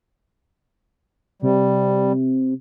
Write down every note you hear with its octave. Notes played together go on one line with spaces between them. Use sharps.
C3 G3